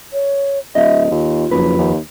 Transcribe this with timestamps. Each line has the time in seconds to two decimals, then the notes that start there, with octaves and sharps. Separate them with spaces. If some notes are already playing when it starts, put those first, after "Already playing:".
0.13 C#5
0.75 D1 D#5 E5
1.11 D#2 F4
1.51 F#1 F2 B4
1.79 D#2